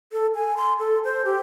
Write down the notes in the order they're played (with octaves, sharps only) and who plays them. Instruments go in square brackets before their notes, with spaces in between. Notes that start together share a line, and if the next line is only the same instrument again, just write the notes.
[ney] A4
G#5
C6
A4
C5
G4